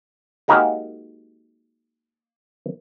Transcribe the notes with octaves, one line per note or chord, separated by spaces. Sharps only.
G#3 A#3 D#4 F#4 G4 A#4